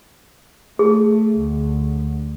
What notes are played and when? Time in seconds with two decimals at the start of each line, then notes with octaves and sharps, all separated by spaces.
0.79 A3 G#4
1.35 D2